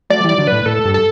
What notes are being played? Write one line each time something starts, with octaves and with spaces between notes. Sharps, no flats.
F#3 A3 D5
E3 G3 D5
D3 F#3
A2 B4
A2 A4
G2
A4